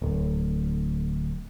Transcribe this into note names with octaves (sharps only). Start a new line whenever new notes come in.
D1